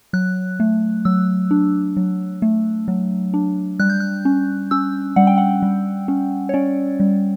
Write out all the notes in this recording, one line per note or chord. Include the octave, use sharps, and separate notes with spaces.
F#3 F#6
A3
F#3 E6
D4
F#3
A3
F#3
D4
G3 F#6
G6
F#6
C#4
C#4 E6
G3 F#5
G5
F#5
G3
C#4
C#5
C#4 D5
G3